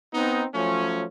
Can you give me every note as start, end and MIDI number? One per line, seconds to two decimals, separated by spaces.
0.14 0.44 59
0.14 0.44 60
0.14 0.44 63
0.55 1.04 53
0.55 1.04 54
0.55 1.04 57
0.55 1.04 61